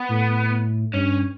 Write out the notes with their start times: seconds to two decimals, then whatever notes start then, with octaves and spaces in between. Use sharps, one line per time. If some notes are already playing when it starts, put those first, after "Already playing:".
Already playing: B3
0.09 A2
0.93 G2 C#4